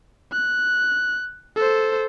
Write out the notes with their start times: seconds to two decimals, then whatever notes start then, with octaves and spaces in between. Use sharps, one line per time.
0.32 F#6
1.56 A4 C5